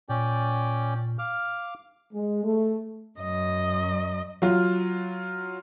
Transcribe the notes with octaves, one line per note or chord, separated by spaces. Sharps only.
A#2 C#4 D5 G5
F5 D6 F6
G#3
A3
F#2 D#5
F#3 F4